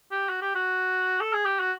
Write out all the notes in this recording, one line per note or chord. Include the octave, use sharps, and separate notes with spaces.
G4
F#4
G4
F#4
A4
G#4
G4
F#4